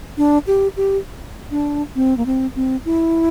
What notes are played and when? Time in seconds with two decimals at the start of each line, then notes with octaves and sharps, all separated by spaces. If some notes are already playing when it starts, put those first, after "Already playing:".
0.18 D4
0.47 G4
0.77 G4
1.51 D4
1.96 C4
2.17 A#3
2.26 C4
2.56 C4
2.85 E4